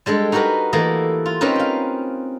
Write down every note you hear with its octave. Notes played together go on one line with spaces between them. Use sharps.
G3 G#3 D4 A4
D#4 F#4 G4 A#4 B4
E3 A3 A#3 E4 D#5
F4
C4 C#4 D#4 A#4 B4
F5 G5